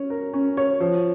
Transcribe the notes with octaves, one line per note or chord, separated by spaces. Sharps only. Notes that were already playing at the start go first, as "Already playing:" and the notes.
Already playing: C#4 C#5
A#4
C#4
C#5
F3